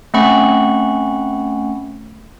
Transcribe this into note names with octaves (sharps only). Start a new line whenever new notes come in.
A3 C4 C#4 F#5 B5 C#6